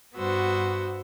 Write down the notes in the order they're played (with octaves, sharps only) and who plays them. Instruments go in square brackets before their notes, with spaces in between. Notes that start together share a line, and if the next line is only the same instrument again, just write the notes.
[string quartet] G2 B3 F#4 C5 E6